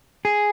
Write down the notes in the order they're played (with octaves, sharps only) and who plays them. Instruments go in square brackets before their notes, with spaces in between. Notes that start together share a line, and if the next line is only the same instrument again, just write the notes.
[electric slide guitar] G#4